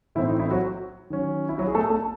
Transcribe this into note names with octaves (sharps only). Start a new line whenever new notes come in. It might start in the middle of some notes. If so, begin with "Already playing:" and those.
A2 E3 C4 D#4 E4
D#4
E4
F#3 F#4
D#3 F#3 C#4
E4
F#3 F#4
G#4
A3 A4
A3 A4